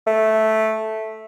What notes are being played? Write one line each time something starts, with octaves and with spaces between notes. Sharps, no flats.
A3